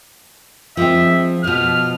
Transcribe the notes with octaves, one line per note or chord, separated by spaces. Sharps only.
F3 G#3 C4 E5
B2 F3 F6